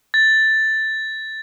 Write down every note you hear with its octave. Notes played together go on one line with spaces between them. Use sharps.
A6